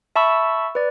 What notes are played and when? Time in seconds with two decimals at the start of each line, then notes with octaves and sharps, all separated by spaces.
0.16 E5 A5 B5 C#6 E6
0.75 B4 D5